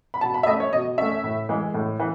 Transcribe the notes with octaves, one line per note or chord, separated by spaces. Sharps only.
B5
B2 A5
B5
E5
A3 C#4 D#5
C#5
B2 D#5
A3 C#4 E5
A2
E3 G#3
A2
E3